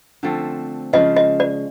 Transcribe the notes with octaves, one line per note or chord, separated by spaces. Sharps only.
D3 F3 A3 C4
C#3 F3 G#3 D#5
D#5
D5